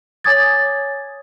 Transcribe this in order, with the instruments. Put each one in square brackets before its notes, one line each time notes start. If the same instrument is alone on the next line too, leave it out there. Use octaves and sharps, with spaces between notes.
[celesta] C#5 G#5 D6 D#6 G#6 A6